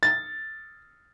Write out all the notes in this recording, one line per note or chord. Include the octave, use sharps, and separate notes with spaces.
A6